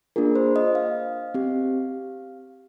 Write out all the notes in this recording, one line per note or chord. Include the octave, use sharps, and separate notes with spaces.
A#3 D4 F4 G#4 A#4
C5
D#5
F5
C4 G4